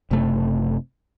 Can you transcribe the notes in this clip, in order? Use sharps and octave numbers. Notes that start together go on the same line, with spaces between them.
F#1 C3 A3